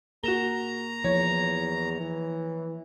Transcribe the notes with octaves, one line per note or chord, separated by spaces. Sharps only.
A#3 F#4 G#4 A#4 A#5 E7 G7
E2 F3 E4 C#5
E3